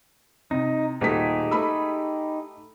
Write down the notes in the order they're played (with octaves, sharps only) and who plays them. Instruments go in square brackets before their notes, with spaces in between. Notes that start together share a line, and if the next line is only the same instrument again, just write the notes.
[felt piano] C3 [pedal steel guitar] D#4
[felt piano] D#1 A3 B6 [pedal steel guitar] D#4 G4 G#4
[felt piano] A3 B5 E6